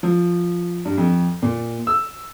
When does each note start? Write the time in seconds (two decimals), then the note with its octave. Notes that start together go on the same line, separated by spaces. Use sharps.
0.03 F3
0.85 G2
0.98 F2
1.43 A#2
1.87 E6